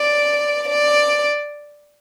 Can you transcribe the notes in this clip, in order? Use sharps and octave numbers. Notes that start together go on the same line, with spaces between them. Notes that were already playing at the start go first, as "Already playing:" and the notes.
Already playing: D5
D5